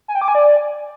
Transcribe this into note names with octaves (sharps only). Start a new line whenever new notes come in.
G#5
G5
D6
G#5
D5